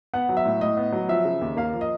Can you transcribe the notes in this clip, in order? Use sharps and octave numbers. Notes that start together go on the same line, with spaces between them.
B3 F#5
F#3
E5
A2
A2 D#5
B3
F#3
F3 E5
C#3
D#2
A#3 F5
F3
D#5